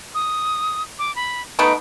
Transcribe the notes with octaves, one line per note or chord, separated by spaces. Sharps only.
D#6
D6
B5
A3 B3 D#4 D7